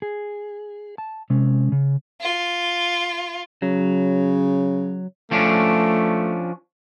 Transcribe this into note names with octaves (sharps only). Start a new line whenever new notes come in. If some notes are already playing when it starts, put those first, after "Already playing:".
G#4
A5
C3 G#3 C#4
C#3
F4
C#3 F#3
F3 A3 C#4 D4